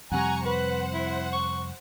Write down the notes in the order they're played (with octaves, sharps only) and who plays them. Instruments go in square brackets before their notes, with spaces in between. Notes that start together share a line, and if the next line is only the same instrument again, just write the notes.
[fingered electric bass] F2 C3 G3 [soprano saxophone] F#5 [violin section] G#5 A#5 C#6
[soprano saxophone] B4 [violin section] C5 F#5
[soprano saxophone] E4
C#6